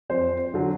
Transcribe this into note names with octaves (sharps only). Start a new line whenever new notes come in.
F2 C5
D3 F#3